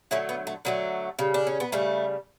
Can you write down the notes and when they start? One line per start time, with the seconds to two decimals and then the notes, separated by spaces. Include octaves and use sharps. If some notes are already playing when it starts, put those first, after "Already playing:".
0.11 D3 F#3 A3 C#4 E4
0.29 B3
0.47 A3
0.65 D3 F#3 A3 B3
1.19 C#3 G3
1.34 D4
1.47 C#4
1.60 B3
1.72 C#3 G3 A3